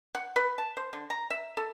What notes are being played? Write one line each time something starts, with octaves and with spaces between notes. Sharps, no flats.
F#5
B4
A5
C5
D3
A#5
E5
A4